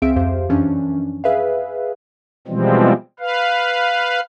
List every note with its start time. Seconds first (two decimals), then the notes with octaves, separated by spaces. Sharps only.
0.02 C#2 C4 G#4 E5 F5 D7
0.16 F2 G4 C5 F5
0.49 F#2 E3 F3 C#4 D4
1.24 G#4 B4 E5 F5
2.48 B2 E3 F3 G3 G#3 C4
3.20 B4 F5